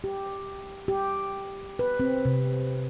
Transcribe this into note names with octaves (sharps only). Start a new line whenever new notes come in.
G4
G4
B4
C4
C3